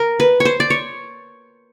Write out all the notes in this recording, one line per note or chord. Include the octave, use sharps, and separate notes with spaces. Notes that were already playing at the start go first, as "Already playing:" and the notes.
Already playing: A#4
B4
C#5
C5
D5
C#5